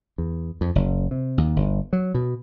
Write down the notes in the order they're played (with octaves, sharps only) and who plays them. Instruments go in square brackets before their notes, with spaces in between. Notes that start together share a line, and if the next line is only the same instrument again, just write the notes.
[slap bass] E2
F2
F#1
C3
D#2
G1
F#3
B2